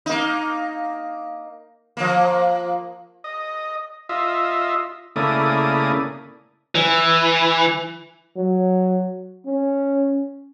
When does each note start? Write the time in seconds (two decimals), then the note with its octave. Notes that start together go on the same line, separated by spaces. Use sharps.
0.06 A#3 D#4
1.97 F3 A#3
3.24 D#5
4.09 F4 D#5 E5
5.16 C#3 A3 A#3 E4 D5 D#6
6.75 E3
8.36 F#3
9.46 C#4